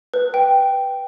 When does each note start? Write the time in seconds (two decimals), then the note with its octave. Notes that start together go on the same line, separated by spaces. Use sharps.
0.14 B4
0.34 G5